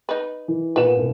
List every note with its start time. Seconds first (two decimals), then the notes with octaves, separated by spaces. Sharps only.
0.09 D#4 B4
0.48 E3
0.76 A#2 B3 B4 F#5 E7
0.96 E1 C2